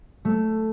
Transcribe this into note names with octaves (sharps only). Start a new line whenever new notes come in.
A3